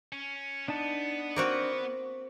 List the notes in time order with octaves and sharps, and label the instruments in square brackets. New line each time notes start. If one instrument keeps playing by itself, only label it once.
[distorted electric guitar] C#4
[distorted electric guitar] B3 [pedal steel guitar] D4 D#4 A5
[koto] A#3 C4 F#4